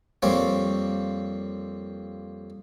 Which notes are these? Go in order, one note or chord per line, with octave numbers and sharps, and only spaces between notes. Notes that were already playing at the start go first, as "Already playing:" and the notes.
F2 G3 A#3 C4 C#5